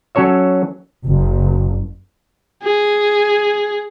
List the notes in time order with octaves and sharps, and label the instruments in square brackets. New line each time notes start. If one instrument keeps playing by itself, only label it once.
[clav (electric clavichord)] F#3 C#4 A4 C#5 E5
[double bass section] F#1
[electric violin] G#4